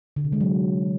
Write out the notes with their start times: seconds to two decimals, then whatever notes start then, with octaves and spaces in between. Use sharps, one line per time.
0.16 D3
0.24 C3
0.33 G#3
0.41 F#3